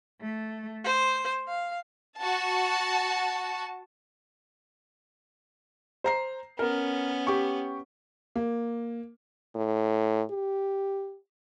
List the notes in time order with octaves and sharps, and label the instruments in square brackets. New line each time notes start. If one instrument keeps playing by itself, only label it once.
[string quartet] A3
C5
F5
[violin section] F#4 A5
[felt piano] C5 A#5 C7
[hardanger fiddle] B3 C#4 [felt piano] A#4
[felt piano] G4 C#6
[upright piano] A#3
[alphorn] A2
G4